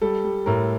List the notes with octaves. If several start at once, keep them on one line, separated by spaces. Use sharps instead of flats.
G3 A4
G3
A2 A#4